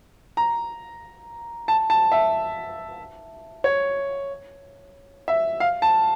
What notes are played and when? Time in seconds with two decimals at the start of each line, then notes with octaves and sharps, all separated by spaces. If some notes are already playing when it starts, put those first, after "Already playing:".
0.37 A#5
1.68 A5
1.90 A5
2.12 E5
3.64 C#5
5.28 E5
5.60 F5
5.82 A5